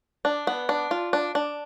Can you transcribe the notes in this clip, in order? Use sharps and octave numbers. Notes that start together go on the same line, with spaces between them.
D4
B3
D4
F4
D4
D4